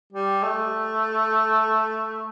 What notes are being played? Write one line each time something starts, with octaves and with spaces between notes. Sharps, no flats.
G3
A3